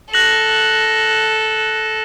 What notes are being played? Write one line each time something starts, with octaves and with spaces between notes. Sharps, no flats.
A4 F#6 A#6 F#7